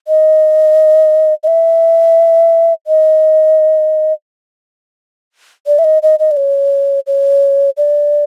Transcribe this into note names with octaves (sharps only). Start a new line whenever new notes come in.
D#5
D#5
E5
D#5
D5
E5
D#5
D#5
D#5
D5
C#5
C#5
D5